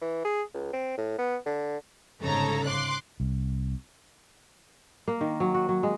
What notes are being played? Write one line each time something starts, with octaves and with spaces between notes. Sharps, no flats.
E3
G#4
C#2
C4
A2
B3
D3
G1 G#2 C#3 A4 C#5 A#5
C6 D6 F#6
C2
A#3
D#3
F#3
F#4
F#3
G#3